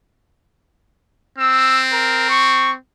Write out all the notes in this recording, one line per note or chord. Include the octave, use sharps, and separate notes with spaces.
C4 E6
A#4
C#6